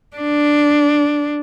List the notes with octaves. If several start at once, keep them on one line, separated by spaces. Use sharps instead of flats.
D4